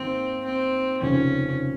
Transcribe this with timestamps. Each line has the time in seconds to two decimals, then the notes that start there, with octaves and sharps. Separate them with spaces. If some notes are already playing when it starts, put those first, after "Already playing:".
Already playing: G#2 D#3 A#3 C4
0.45 C4
1.02 F1 D#2 C#3 F3 C4 C#4